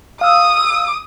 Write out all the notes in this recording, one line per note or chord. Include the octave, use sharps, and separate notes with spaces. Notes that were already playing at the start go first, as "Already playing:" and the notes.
F5 D#6 E6